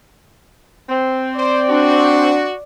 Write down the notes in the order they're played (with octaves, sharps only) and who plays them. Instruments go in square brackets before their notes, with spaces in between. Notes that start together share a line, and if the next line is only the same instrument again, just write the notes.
[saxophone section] C4
[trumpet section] C5 [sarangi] D5
[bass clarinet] D4 [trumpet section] F#4